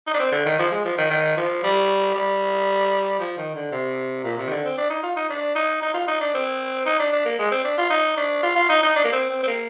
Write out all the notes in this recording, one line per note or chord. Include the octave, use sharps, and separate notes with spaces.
D#4
D4
C4
D3
D#3
F3
G#3
F3
D#3
D#3
F3
G3
G3
F3
D#3
D3
C3
A#2
C3
D#3
D3
C4
D4
D#4
F4
D#4
D4
D#4
D#4
F4
D#4
D4
C4
D#4
D4
D4
A#3
G#3
C4
D4
F4
D#4
D4
F4
F4
D#4
D#4
D4
A#3
C4
C4
C4
A#3